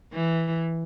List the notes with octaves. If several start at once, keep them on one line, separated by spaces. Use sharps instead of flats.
E3